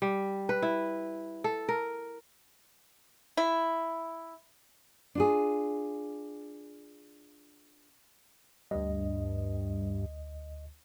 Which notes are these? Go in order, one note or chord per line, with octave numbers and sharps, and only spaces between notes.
G3
B4
E4
A4
A#4
E4
D4 F4 G#4
D2 G2 D#5